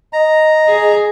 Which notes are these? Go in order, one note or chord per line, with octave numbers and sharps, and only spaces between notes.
D#5 A#5
G#4